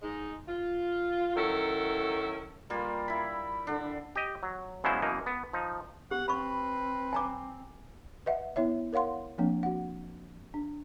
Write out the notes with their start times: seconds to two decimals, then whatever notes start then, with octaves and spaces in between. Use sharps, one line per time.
0.02 G#2 G#3 D#4
0.48 F4
1.36 D#3 F#3 C#4 E4 A4
2.70 G3 A#3 F4
3.08 E4 B5
3.67 D3 D4
4.16 G4 D#5
4.43 F#3
4.84 C#3 F#3 G#3 B3 E4 C5
5.02 F#2 B2 E3 A#3 D#4
5.26 B3
5.53 F3 D#4
6.11 B3 G4 F#5
6.28 C4 B4 B5 C#6
7.13 G#5 A#5 D6
8.26 B4 D#5 E5 F#5
8.56 B3 E4 C#5 E5
8.93 A#4 C#5 F5 F#5 C6
9.38 F3 A#3 C4 D4
9.63 F#4 F#5
10.54 D4